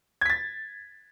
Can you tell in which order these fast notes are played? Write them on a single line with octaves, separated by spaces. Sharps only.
G#6 B6 A6